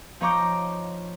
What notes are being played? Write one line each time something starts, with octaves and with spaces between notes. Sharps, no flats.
F3 D#4 C#5 A#5 D6 G6